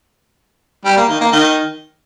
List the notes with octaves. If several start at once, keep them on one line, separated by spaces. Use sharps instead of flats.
G3
A#3
D#3
A#3
D#3